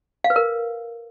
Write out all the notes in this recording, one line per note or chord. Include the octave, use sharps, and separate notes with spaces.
F5
B4
A#4